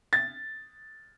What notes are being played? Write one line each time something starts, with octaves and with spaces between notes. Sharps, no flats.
A6